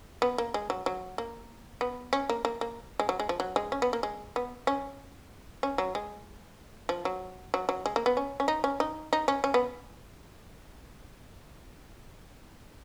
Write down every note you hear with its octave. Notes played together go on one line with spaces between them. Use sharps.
B3
A#3
G#3
F#3
F#3
A#3
B3
C#4
A#3
A#3
A#3
G#3
F#3
G#3
F3
F#3
G#3
C#4
B3
A#3
G#3
B3
C#4
C#4
F#3
G#3
F3
F#3
F#3
F#3
G#3
A#3
B3
C#4
C#4
D#4
C#4
D#4
D#4
C#4
C#4
B3